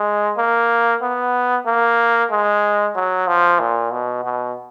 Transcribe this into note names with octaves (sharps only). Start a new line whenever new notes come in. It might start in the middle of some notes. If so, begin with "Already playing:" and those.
Already playing: G#3
A#3
B3
A#3
G#3
F#3
F3
A#2
B2
B2